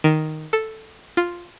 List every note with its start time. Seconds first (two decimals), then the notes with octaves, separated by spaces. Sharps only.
0.04 D#3
0.53 A4
1.17 F4